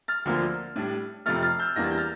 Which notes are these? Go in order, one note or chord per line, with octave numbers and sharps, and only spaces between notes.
F6 A6
D2 D3 F3 A#3
A2 G3 D4
F2 C3 F3 A3 F6 A6
F6 A6
E6 G6
E2 E3 G3 A#3 D4 A#6
A6
G6
F6 A6